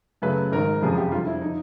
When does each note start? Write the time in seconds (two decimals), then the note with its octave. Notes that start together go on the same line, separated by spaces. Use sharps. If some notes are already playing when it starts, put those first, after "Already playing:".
0.22 F#2 C#3 F#3 A3 B4
0.52 G#1 G#2 D#3 A#4
0.82 F#1 F2 C3 F3 G#4
0.98 G4
1.12 F2 D3 G3 F4
1.27 E4
1.41 F3 D#4